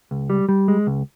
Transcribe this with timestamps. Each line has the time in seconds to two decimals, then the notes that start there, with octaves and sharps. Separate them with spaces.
0.11 C#2
0.30 G3
0.49 G3
0.68 G#3
0.87 C#2